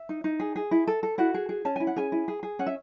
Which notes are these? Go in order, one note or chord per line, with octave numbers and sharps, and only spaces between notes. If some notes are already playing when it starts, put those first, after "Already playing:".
Already playing: E5
D#4
D#4
G#4
G#4
E4
A4
A4
E4 F#4 F#5
G#4
G#4
C#4 A5
E4 G#5
F#5
C#4 G#4 G#5
E4
G#4
G#4
C#4 F#5
E5